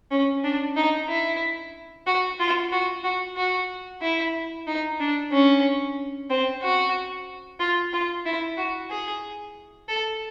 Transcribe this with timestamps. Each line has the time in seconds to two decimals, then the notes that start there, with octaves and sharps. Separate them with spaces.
0.11 C#4
0.44 D4
0.76 D#4
1.09 E4
2.07 F#4
2.40 F4
2.73 F#4
3.04 F#4
3.36 F#4
4.02 E4
4.67 D#4
5.00 D4
5.32 C#4
6.30 C4
6.62 F#4
7.60 F4
7.93 F4
8.26 E4
8.57 F#4
8.91 G#4
9.89 A4